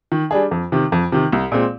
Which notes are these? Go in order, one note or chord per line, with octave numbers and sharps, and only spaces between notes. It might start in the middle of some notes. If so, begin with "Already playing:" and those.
D#3
G3 D4 G#4
F2
C3 D#3
F2
C3 D#3
C2
A#2 G#3 C4